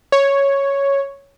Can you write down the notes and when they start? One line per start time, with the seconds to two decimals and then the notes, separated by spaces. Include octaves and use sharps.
0.12 C#5